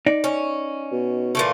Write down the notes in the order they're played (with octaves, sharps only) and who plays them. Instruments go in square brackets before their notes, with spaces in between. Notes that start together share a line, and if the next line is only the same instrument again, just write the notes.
[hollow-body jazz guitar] D#4 D5
[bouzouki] C#4
[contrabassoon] B2
[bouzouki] A#2 E3 A3